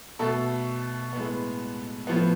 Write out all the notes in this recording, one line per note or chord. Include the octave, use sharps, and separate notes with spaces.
B2 A3 A4
A2 G#3 B3
A2 F3 B3